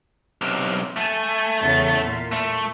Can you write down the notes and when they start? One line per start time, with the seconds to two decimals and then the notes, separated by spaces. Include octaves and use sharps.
0.41 B1 C3
0.96 A3 G#5 A5
1.59 E2 C#3 A6
2.02 A#2
2.32 A3